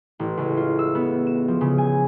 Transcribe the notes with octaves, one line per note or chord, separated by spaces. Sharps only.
A1
C#2
F4
E6
B3
E7
F3
C#3
G#5